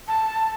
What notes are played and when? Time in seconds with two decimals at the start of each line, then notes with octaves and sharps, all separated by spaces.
0.08 A5